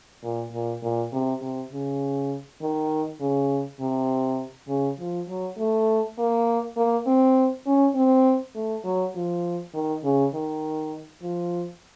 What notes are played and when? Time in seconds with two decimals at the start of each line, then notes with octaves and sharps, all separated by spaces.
0.23 A#2
0.52 A#2
0.82 A#2
1.12 C3
1.41 C3
1.72 C#3
2.61 D#3
3.20 C#3
3.80 C3
4.68 C#3
4.99 F3
5.28 F#3
5.58 A3
6.18 A#3
6.77 A#3
7.07 C4
7.67 C#4
7.95 C4
8.55 A3
8.85 F#3
9.15 F3
9.74 D#3
10.04 C#3
10.34 D#3
11.22 F3